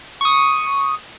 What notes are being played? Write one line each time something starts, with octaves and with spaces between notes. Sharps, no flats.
C#6 D#6